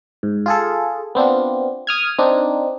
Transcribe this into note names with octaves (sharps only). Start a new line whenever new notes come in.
G#2
F4 G#4 A4
B3 C4 D4 F4
D#6 F6 G#6
C4 D4 D#4